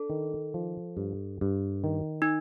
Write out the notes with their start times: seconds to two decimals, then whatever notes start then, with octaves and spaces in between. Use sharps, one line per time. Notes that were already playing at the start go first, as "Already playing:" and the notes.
Already playing: D4 A4
0.10 D#3
0.54 F3
0.97 G2
1.41 G2
1.84 D#3
2.22 D#4